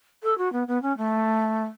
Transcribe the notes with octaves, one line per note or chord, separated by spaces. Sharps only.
A4
F#4
B3
B3
C#4
A3